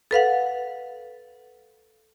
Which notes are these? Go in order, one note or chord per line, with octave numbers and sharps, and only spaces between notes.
A4 B4 F5 F#5